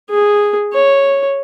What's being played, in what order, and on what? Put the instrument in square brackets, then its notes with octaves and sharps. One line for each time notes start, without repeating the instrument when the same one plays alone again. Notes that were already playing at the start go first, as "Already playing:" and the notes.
[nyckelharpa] G#4
C#5